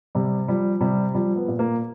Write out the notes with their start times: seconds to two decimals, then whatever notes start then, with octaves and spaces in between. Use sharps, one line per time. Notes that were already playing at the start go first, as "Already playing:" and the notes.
0.15 C3 G3
0.48 F3 G3
0.81 C3 G3
1.15 F3 G3
1.36 B3
1.48 A#2
1.59 A#3